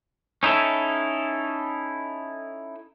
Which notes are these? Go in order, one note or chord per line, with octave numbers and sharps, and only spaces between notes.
C#4 D#4 E4 A4